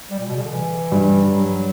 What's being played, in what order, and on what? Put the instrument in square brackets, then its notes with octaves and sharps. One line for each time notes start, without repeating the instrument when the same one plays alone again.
[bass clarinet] G3
A#2
B2
C#3
D3
E3
[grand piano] G2
[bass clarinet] F#3